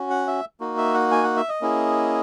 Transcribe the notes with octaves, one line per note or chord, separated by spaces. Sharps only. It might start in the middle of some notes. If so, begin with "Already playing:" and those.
Already playing: C#4 F#4
F#5
E5
A#3 D#4 F#4
E5
F#5
G#5
F#5
E5
D#5
A#3 C#4 E4 G#4